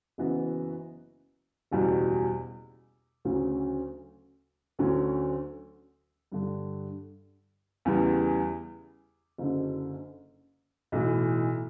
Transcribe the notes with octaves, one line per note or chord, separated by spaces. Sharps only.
F#1 F#2 E3 B3 F#4
F#1 E2 B2 G3
D2 C#3 F#3 C#4
D2 D3 F#3 C#4
G2 D3 G3
E2 C#3 E3 G3 B3
F#1 F#2 D3
B1 A2 E3